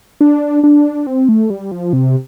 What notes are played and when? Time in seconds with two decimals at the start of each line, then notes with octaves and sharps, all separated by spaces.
0.21 D4
0.64 D4
1.07 C4
1.29 A3
1.50 G3
1.71 F3
1.93 C3